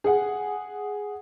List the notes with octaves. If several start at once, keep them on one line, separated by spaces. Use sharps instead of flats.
G#4 F#5